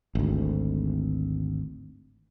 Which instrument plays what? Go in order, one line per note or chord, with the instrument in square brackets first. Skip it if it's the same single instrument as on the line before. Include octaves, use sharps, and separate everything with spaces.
[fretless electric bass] G#1 D2